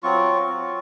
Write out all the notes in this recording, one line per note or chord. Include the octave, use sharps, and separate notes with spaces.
F#3 C4 F4 C#6
F#3 C4 F4